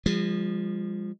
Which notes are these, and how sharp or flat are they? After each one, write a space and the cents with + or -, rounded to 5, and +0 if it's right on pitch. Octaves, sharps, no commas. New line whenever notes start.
F3 +0 G#3 -40